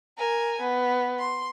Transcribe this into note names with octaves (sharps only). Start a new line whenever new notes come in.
A#4 G#5
B3
C6